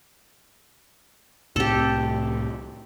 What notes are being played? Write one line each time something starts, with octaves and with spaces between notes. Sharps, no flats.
C2 A2 C4 G4 A4